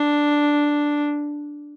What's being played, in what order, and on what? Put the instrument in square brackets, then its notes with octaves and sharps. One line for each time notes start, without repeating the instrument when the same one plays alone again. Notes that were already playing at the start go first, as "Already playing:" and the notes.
Already playing: [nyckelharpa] D4